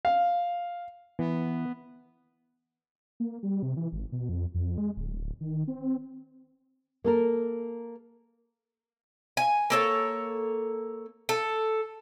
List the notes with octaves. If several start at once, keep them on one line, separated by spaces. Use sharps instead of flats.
F5
E3 B3
A#3
G3
C3
E3
G#1
B2
F2
F2
G#3
D1
D#3
C4
A#3 A4 A#4
G#5
A#3 A4 C#5
A4